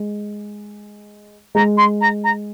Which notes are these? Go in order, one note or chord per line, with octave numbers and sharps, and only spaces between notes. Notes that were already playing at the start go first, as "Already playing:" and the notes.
Already playing: G#3
G#3 A#5
C6
A#5
A#5